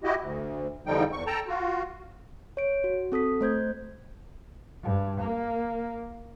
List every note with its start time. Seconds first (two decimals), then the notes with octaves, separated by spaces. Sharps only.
0.04 E4 F#4 G4 D#5
0.21 D2
0.87 E2 D3 F3 G3 D#4 G5
1.12 E2 C#6
1.27 A4 G5 A5 A#5
1.48 F4 F#4
2.57 C#5 D7
2.84 F#4
3.12 C4 A4 D#6 B6
3.41 A3 C5 G6 G#6
4.84 G2
5.20 A#3